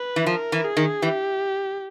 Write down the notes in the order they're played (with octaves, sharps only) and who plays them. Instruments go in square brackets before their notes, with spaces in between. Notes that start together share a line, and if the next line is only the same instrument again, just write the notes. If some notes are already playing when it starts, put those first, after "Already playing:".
Already playing: [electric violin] B4
[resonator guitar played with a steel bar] E3
[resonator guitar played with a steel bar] F3 [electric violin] A#4
[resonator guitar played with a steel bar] E3
[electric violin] G#4
[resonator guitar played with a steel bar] D#3
[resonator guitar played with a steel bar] E3 [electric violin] G4